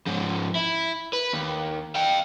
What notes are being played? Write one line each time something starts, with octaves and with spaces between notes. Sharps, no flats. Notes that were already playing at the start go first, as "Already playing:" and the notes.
G#2 F3
E4
B4
D#2
F5 G5